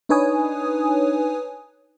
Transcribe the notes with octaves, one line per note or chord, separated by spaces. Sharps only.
D4 D#4 B4 C#5 G#5 D#6